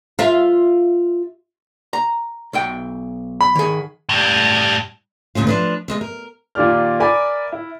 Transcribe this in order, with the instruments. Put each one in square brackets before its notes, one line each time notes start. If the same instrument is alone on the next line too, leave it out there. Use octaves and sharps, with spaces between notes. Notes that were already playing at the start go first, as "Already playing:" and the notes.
[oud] F4 E5
[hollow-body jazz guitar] A#5
B1 E5 G5
[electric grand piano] B5
[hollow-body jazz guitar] D#3 G#4
[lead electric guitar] A2 G3
[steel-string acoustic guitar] D2 G2 A#2 C#4 F4
F3 D4 B4
E2 G#3 D#5
A#4
[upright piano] A#2 D#3 F4 G4 D5 F6
A#4 D5 E5 G#5 B5 D6
E4